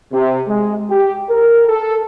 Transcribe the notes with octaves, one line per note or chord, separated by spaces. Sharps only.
C3
G#3
G4
A#4
A4